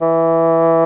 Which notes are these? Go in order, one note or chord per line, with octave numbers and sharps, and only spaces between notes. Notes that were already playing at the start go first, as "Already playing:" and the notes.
E3